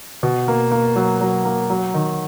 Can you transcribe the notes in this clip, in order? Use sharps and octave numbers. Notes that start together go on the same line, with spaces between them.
B2
A#3
A#3
F#3
F#3
A#3
F#3
D#3